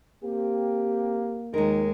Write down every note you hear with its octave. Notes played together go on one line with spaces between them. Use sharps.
A#3 C4 G4
D#2 D#3 F3 G#3 D#4 A#4